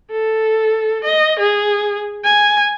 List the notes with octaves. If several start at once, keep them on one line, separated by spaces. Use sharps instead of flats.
A4
D#5
G#4
G#5